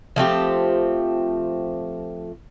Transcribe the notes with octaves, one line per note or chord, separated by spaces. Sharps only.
F3 A3 C4 G4